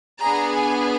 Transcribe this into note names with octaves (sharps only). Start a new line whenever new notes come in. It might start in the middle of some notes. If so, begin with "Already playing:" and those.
B3 D4 G#4 A#5
G#5